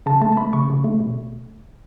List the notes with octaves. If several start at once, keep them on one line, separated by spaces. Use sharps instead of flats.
C#3 A5
A3 A5
A5
A3 B5
C#3 C#6
C#3
A3
B2